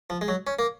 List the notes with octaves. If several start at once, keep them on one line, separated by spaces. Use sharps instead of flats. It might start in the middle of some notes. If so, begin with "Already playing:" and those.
F3
G#3
F#3
C#4
A#3